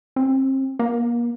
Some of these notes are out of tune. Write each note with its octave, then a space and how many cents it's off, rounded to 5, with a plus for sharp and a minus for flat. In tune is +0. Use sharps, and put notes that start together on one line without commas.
C4 +35
A#3 +35